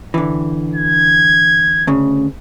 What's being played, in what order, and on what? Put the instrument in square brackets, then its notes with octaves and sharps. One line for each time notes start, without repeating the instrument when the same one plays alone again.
[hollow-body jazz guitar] D3 E3
[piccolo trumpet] G#6
[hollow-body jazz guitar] D2 C#3